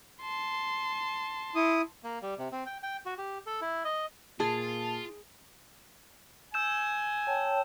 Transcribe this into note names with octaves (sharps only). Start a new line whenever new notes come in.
A5 C6
E4 D#6
A#3
G3
C3
C4
G5
G5
F#4
G4
A4
E4
D#5
A#2 F4 G#4 A5
G#5 E6 G6 E7
C#5 G5 A5